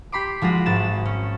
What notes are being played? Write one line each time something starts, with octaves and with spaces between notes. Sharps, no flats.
G4 B5 C6 D6
F3 G#3 F4 F#4
G#1 A6 E7
C#4